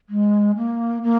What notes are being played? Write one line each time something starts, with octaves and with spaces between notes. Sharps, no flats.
G#3
A#3
A#3